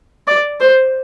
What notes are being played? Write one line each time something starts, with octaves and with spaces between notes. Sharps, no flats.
D5
C5